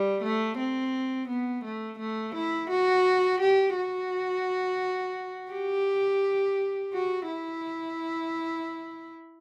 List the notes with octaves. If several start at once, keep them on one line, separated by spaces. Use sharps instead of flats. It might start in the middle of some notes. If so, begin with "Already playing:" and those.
Already playing: G3
A3
C4
B3
A3
A3
E4
F#4
G4
F#4
G4
F#4
E4